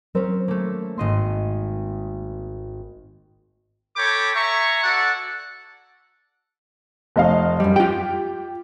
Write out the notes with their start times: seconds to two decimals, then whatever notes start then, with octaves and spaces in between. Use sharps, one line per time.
0.15 F#3 C4 C#4 A#4 C5
0.48 A3 A#3
0.98 G#1 A#3 D#5 C6
3.96 A4 C#5 G5 B5 D6
4.35 E5 G#5 A#5 C#6
4.83 F#4 A4 D5 F#5
7.16 F1 D#5 F5
7.60 F#2 G3
7.76 F4 G4 G5